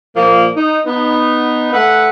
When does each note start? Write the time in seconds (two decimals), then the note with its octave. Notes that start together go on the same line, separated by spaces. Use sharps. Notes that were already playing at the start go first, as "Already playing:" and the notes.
0.16 A#2 F3 A#3
0.57 D#4
0.86 B3 D#4
1.73 A3 B4 E5 F#5